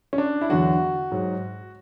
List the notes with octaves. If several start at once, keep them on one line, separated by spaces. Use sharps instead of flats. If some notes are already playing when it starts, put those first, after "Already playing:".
C#4
D4
E4
E2 D3 F#3 F#4
G#2 F#3